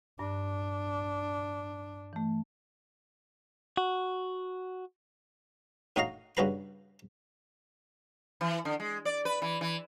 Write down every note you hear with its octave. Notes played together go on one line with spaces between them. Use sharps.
G2 D4
E3 A3
F#4
A2 D#4 F#4 D#5 F5 A#5
G2 C#3 F#4 B4 A#5 B5
E3
D3
G#3
D5
B4
E3
E3